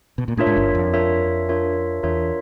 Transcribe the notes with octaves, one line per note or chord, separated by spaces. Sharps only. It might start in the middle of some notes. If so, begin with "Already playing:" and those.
B2
A#2
A2 D4 F4 A#4 C#5 E5
G#2
G1 G2
F2
D4 F4 A#4 C#5 E5
D4 F4 A#4 C#5 E5
E2 D4 F4 A#4 C#5 E5